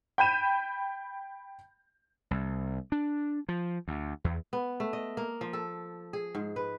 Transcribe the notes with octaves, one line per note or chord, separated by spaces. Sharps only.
G5 B5 G6 D#7 E7
C2
D4
F3
D2
E2
B3
A3
D#5
A#3
F3
A4
G#4
G#2
B4